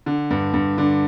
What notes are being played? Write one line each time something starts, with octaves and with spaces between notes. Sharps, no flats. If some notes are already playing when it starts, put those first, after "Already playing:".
D3
G2
G2
D3